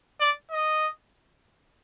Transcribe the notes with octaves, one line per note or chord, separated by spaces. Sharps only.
D5
D#5